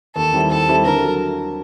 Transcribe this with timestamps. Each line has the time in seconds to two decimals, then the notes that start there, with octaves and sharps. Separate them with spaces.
0.16 D#2 A4
0.33 D#3 G3 C4 E4
0.50 D#2 A4
0.68 D#3 G3 C4 E4
0.86 D3 A#4
1.03 F#3